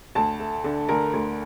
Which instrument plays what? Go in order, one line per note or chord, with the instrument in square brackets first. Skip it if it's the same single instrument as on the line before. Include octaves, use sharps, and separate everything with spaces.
[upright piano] D2 A5
A3
D3
D2 A#4
D2